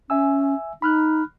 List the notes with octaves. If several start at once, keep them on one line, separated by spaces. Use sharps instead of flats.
C#4 E5 G#5 E6
D#4 B5 F6 F#6